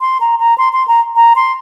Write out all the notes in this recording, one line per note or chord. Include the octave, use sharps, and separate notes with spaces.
C6
A#5
A#5
C6
C6
A#5
A#5
C6